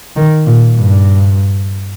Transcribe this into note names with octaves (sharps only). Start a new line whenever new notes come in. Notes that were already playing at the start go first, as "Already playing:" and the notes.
D#3
A#2
G2